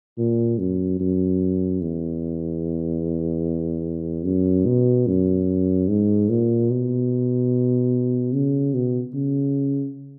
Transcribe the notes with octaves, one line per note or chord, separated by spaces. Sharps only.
A#2
F#2
F#2
E2
F#2
B2
F#2
G#2
A#2
B2
C#3
B2
C#3